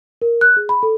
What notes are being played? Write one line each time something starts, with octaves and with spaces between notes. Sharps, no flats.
A#4
F#6
G#4
B5
A4